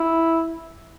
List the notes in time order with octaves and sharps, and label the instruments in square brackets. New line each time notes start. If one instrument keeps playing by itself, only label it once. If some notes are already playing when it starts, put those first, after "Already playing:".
Already playing: [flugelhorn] E4